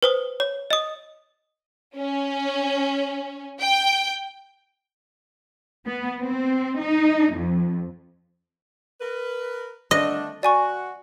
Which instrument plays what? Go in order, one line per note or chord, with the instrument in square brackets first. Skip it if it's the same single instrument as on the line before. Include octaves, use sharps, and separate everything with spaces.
[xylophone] B4 C5 D#6
C#5
D#5 D#6
[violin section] C#4
G5
[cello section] B3
C4
D#4
F2
[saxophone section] A#4 B4
[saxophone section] D3 A3 D4 [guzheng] D#5
[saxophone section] F#4 [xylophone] D5 G#5 C#6